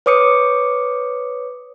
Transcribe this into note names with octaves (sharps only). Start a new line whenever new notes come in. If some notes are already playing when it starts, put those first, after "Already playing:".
B4 C#5 D6 D#6 C#7